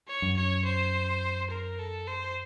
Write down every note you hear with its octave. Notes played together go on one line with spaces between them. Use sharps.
C#5
F#2
C#5
C5
A#4
A4
C5